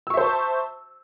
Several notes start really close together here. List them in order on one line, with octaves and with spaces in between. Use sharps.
E6 C#6 E5 C5 A5